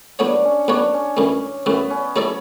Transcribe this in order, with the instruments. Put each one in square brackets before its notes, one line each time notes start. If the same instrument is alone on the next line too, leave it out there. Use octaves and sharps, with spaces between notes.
[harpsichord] A2 F#3 B3 F#4 C#5 [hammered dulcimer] D4
[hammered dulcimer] C#4
[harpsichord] A2 F#3 B3 F#4 C#5 [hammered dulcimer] D4
[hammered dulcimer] C#4
[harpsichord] F#2 E3 A3
[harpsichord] F#2 E3 A3 [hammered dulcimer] B3
[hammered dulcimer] C#4
[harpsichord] F#3 A3 E4 A4 D5